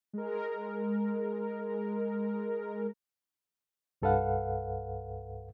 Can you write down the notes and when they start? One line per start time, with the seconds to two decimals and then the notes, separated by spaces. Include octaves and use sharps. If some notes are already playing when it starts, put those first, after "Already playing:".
0.13 G#3 A#4
4.02 C2 G2 A4 B4 F5 F#5